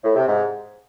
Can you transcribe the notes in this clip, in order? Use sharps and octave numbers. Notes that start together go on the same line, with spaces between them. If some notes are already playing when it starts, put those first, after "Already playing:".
A2
C3
G#2